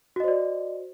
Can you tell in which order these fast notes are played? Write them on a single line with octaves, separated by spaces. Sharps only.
F#4 D#5 C5 D5